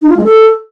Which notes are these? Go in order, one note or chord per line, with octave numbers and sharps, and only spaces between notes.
D#4
F4
G#3
A4